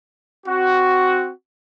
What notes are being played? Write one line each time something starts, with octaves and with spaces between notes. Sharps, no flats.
C4 F#4